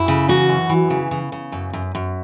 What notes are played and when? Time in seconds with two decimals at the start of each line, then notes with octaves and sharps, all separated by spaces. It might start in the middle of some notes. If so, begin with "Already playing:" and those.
Already playing: F#2 E4
0.08 C#3
0.28 E3 F#4
0.49 F#2
0.69 E3
0.90 C#3
1.11 C#3
1.32 C#3
1.52 F#2
1.73 F#2
1.95 F#2